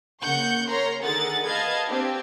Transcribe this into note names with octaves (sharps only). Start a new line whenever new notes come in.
C#3 A#3 F#5 C#6 G6
A#4 C#5 A#5 C6
D3 D#3 G#4 A#4 F#5 A6
B4 D#5 F5 A5 G#6 A6
C4 D4 G4